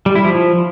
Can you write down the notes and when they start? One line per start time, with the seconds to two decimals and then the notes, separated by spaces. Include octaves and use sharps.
0.06 G3
0.15 E4
0.25 F3